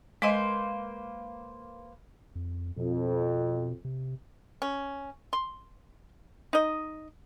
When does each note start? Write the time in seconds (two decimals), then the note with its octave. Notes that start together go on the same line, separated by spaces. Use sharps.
0.22 G#3 A#3 B4 C5 D#5
2.35 F2
2.77 F2 B2
3.85 C3
4.62 C#4
5.33 C6
6.53 D#4 D#5